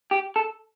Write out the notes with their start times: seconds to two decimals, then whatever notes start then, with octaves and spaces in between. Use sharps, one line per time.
0.11 G4
0.36 A4